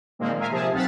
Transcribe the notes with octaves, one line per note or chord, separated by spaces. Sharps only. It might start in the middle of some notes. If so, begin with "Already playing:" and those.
A#2 D#3 F3 G#3 A#3 C4
A#4 E5 F5 G#5 A#5
C3 F3 G#4 A5
B1 C4 F5 F#5 A6 B6